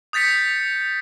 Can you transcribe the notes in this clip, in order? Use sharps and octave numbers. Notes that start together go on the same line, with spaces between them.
D#6 G6 A6 B6 C#7